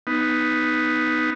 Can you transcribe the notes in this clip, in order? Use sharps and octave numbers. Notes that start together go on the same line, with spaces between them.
B3 D#4